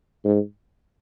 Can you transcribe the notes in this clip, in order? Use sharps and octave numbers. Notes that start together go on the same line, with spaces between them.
G#2